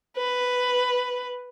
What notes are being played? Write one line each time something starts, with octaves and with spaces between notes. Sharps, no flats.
B4